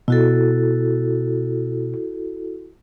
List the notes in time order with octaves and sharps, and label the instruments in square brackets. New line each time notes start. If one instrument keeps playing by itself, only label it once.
[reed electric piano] B2 [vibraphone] E4 F#4 A4